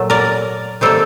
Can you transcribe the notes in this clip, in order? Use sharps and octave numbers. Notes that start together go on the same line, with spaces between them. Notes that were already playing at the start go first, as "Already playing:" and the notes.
Already playing: A#2 F#3 A3
A#4 D5
C3 D#3 G3 A#3 A4 C5